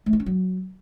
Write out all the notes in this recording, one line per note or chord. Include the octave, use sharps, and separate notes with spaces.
A3
D#4
C#4
F#3